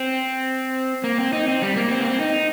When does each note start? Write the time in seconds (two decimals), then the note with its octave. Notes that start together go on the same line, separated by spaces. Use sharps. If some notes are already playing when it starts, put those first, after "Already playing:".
Already playing: C4
1.04 A#3
1.18 C4
1.33 D#4
1.48 C4
1.62 G3
1.76 A#3
1.91 C4
2.00 A#3
2.07 C4
2.20 D#4